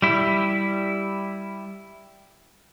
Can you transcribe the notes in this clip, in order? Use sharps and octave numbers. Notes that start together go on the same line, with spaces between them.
G3 E4